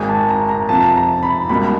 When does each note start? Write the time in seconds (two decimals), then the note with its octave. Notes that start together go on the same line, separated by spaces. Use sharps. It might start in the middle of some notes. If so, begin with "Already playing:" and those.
Already playing: G#1 G#2 D#3 G#3 G#5
0.09 A5
0.29 A#5
0.49 A#5
0.68 F2 C3 F3 A5
0.96 A#5
1.23 B5
1.49 C#2 B2 G3 A#3 B5